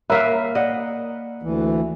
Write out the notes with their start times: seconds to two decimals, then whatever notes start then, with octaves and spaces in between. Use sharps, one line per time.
0.10 A#3 A#4 B4 C#5 E5 F5 A#5
0.55 D5 D#5 F#5
1.43 D2 E3